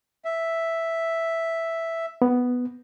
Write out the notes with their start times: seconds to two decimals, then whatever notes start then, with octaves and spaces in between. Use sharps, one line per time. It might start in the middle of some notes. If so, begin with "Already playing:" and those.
0.25 E5
2.22 B3